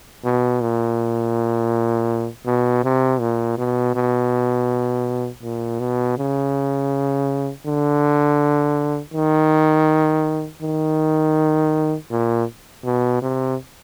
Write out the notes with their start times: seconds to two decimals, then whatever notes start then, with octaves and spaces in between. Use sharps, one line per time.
0.24 B2
0.61 A#2
2.46 B2
2.84 C3
3.20 A#2
3.58 B2
3.95 B2
5.43 A#2
5.80 B2
6.18 C#3
7.66 D3
9.14 D#3
10.62 D#3
12.11 A#2
12.85 B2
13.22 C3